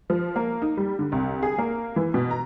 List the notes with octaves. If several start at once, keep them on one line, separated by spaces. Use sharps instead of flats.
F3
A#3
D#4
G3
D3
C2
G#4
A#3
E3
B2
A#5